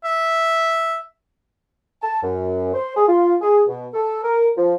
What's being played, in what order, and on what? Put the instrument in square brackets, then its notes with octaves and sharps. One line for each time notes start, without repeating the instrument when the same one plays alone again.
[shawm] E5
[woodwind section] A5
F#2
C5
G#4
F4
G#4
B2
A4
A#4
F3